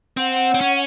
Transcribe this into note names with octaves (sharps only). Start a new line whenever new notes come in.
C4 F#5
C#5
C4
C#4